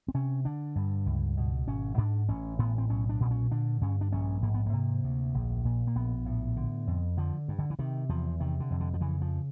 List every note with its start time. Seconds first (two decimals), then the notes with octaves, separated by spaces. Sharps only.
0.08 C4
0.14 C3 C#4
0.45 D3 D4
0.76 G2
1.06 C#2
1.37 B2
1.67 G#1 C#4
1.98 G#2 D4
2.28 A1 C#4
2.59 A2 B3
2.78 C4
2.89 B1 C#4
3.09 D4
3.20 A#2 C4
3.31 C#4
3.51 D3 D4
3.81 G2 C#4
4.01 D4
4.12 A#1 C#4
4.42 G#2 A#3
4.54 B3
4.66 A#3
4.73 C3
5.04 D2
5.34 A#1
5.65 A#2
5.87 A#3
5.95 A#1 B3
6.26 A2
6.57 D3
6.87 F2
7.17 D3 F3
7.48 G2
7.59 D3
7.70 E3
7.79 C3 D#3
8.09 E2 F3
8.40 C3 D#3
8.60 D3
8.71 F2
8.80 D3
8.94 F3
9.01 C#3 E3
9.22 F3